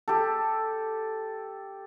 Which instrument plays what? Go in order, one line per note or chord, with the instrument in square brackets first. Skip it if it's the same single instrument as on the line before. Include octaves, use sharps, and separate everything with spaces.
[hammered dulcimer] G4 A4